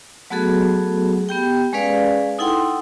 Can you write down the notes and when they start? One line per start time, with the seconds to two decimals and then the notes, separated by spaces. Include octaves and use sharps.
0.30 F#3 A3 B3 F#4 G#4 A4
1.29 B3 G4 G5
1.73 G#3 C#4 G#4 B4 D5 F5
2.39 D#4 E4 A4 F#5 G5 C6